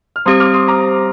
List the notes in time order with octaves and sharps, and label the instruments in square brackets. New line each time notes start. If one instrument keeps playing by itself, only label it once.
[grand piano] F6
[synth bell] G3 C4 G4 C5 [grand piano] C6 D#6
[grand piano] D6 F6
C6 D#6
A#5 D6